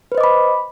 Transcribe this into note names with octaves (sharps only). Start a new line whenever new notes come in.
B4 C5 D#5 B5 D6